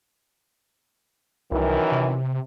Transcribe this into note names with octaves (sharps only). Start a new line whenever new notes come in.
C2 F#2 D#3 E3
C3